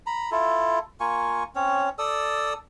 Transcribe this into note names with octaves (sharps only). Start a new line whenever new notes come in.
A#5 B5
E4 F4 A4
A#3 F4 G#5 C#6
C4 C#4 C#5
A4 D5 D#6 E6